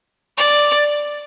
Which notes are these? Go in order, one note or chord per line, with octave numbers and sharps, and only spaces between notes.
D5